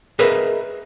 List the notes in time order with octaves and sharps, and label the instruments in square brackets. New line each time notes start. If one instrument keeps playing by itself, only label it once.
[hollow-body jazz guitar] G#4 A#4 B4 D#5 E5